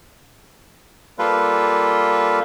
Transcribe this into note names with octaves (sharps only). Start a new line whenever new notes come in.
G3 A#3 F4 A4 B4